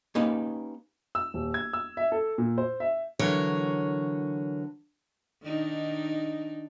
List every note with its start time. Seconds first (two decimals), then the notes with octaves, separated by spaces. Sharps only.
0.15 A#3 C#4 D#4 G4 B4
1.15 E6
1.34 D#1
1.54 G#6
1.73 E6
1.97 E5
2.12 A4
2.38 A#2
2.58 C5
2.80 E5
3.19 D3 E3 F#3 A#4 C#5
5.43 D#3 D4 D#4